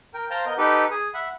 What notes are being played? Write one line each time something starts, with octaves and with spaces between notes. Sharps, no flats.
A#4 G5
C5 F5 G5 A5 A#5 C6
B3 A#4 D#5 G6
D#4 G4 A4 B4
G#4 D#6
E5 F#5 B5